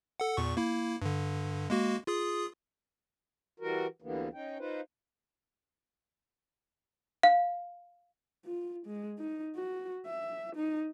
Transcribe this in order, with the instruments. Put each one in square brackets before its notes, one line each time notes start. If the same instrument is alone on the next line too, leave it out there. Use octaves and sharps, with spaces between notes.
[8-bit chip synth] A4 F#5
E2 A#2 C#6
A#3 E4
G2 D3
G#3 A#3 F#4
F4 G#4 D#6
[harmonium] E3 G3 F#4 A#4
D2 D3 E3 G3 A#3 B3
C#4 D#4 G5
D#4 F4 B4 C5
[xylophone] F5
[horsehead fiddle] F4
G#3
D#4
F#4
E5
D#4